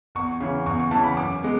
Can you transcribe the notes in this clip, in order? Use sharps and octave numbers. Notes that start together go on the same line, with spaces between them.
E2 C#6
C#3 E3
E2 C#6
C#6
C#3 E3 A5
B5
F#2 D6
G#3 B3